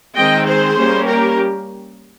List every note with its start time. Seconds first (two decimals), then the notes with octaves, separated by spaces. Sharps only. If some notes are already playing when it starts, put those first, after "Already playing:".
0.16 D#3 G#3 C4 D#5 G5
0.47 G#4 C5
0.77 G3 A#3 C#4
1.06 G4 A#4